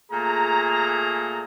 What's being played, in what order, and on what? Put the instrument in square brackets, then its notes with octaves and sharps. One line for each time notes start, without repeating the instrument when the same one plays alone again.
[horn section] A#2 A3 G#4 A#5